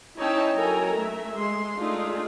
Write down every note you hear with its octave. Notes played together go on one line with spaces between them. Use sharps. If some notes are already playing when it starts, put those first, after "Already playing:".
C#4 D#4 E4 C#5 G5 A5
F#3 A4 A#4 G#5 A#5
A3 E5
G#3 C6
A3 D4 D#4 F4 G#4